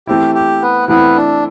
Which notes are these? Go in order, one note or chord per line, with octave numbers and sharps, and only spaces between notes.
E3 A3 C4 E4 G4
G4
B3 B4
E3 A3 B3 C4 E4 B4
D4